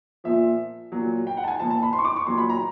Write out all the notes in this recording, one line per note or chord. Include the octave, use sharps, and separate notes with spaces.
A#2 F3 E5
A#2 F#3
G5
F#5
A5
G#5
A#2 F3 A5
A5
B5
C6
C#6
D6
C#6
A#2 F#3 C6
B5
A#5